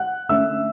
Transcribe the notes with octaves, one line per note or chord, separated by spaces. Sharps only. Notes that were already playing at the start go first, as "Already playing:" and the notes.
Already playing: F#5 F#6
D3 A3 C#4 E5 E6